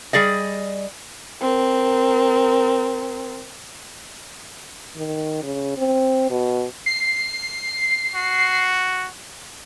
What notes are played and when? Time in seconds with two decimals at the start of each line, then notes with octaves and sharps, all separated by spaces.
0.13 G3 G#4 D5 D#5
1.42 C4 A#4
4.96 D#3
5.43 C#3
5.78 C4
6.30 B2
6.86 C7
8.15 F#4